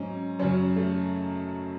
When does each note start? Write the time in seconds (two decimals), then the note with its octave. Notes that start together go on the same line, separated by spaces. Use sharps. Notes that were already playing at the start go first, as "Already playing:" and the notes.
Already playing: G#2 F#3 C#4
0.39 F#2 C#3 F#3 C#4
0.76 A3